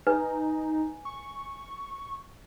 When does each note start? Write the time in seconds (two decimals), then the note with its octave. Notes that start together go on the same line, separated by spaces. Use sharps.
0.07 D#4 B4 G#5
1.05 C#6